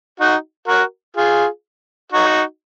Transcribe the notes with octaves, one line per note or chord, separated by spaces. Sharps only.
D#4 F#4
F#4 A#4
F4 G#4
D#4 F#4